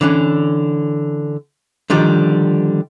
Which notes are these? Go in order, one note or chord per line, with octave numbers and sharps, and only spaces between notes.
D3 E3 C#4
D3 D#3 F3 G3